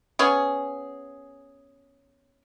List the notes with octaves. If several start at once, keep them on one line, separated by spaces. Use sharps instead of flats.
B3 C#4 G#4